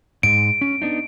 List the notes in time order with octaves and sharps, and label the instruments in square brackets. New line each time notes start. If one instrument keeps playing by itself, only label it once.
[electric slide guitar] G#2 G#3 [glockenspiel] D7
[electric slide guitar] C#4
B3 D4 D#4